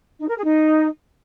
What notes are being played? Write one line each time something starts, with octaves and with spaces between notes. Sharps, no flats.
D#4
A#4
G#4
D#4